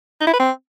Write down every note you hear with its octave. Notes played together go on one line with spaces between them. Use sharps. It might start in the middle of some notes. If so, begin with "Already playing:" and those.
D#4
E4
B4
C4